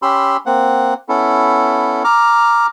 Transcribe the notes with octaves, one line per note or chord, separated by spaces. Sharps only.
C#4 G4 B5 C6 E6
A#3 C4 F#5
B3 C#4 E4 A4
A#5 D6 F6